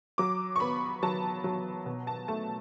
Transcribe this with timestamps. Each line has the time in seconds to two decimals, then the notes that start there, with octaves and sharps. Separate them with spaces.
0.18 F#3 D6
0.56 C#6
0.60 B3 B5
1.03 F#3 A5
1.44 F#3
1.86 B2
2.07 A5
2.28 A3 A5